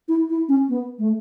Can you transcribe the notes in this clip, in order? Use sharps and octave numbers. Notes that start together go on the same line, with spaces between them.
E4
E4
C#4
B3
A3